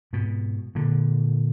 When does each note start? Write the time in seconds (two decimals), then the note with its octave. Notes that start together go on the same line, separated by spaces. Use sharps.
0.13 G#2 B2
0.75 A#2 D3